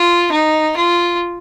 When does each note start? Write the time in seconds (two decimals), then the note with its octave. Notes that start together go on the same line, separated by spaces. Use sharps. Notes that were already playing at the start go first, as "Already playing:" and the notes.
Already playing: F4
0.32 D#4
0.76 F4